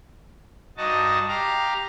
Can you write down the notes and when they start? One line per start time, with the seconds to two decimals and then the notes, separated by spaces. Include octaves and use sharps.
0.77 G2 D#4 F#4 D#5 A5
1.28 G4 F5 A#5